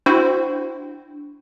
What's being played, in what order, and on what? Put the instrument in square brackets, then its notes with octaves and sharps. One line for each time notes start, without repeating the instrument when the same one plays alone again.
[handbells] D4 [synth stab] E4 F#4 C5